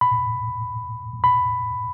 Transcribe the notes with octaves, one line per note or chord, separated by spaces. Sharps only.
B5
B5